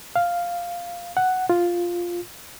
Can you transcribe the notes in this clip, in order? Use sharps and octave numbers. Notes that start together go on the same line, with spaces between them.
F5
F#5
F4